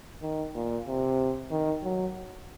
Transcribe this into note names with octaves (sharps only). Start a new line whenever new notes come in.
D#3
A#2
C3
D#3
F#3